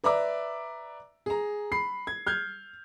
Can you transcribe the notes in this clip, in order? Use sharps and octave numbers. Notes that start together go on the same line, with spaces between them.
B4 D5 E5 A#5 D6
G#4 A#5
B5 C7
G#6
F6 G6 G#6